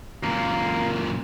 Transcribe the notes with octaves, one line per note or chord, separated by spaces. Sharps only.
F#2 A#2 A#3